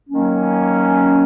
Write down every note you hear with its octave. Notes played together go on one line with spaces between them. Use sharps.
D#3 F#3 A#3 C#4